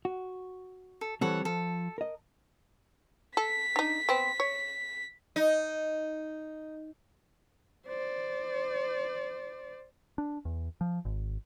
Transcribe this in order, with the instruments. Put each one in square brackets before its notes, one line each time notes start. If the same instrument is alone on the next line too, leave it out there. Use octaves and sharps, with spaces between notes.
[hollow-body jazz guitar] F#4
[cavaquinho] A4
[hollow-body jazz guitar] E3 G3 C4 [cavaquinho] A4 C#5 F#5
[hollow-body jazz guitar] F3 [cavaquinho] A4
[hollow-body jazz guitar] A#4 D#5
[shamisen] A4 [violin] B6
[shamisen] D4 D#4
B3 C4
C#5
[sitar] D#4
[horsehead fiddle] C5 D5
[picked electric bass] D4
E2
F3
G#1